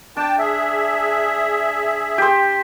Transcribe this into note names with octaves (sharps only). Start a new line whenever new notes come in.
D4 G5 A5
G#4 E5
G4 C5